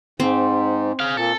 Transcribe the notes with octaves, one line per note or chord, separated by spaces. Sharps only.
G#2 C4
G#4 F5
A#2 A4